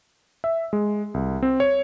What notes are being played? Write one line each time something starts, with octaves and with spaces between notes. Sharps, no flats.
E5
G#3
C2
C4
C#5